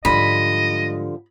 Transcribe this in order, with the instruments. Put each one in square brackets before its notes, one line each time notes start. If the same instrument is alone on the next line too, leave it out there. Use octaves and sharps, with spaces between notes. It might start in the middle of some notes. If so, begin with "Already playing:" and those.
[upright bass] G#2 G#3 [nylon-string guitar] D3 F3 G3 [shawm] D#5 [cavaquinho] B5